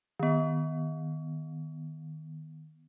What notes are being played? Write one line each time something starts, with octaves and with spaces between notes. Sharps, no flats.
D#3 B3